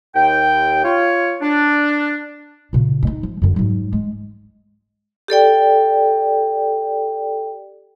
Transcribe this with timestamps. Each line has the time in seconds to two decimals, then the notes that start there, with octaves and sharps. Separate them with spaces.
0.15 D#2 G5
0.85 F4 C#5
1.41 D4
2.73 A#2 C#3
3.03 G2 D#4
3.23 F3
3.42 F#2 D3
3.56 G#2 F#3
3.93 G#3
5.28 G4 A4 D5 G5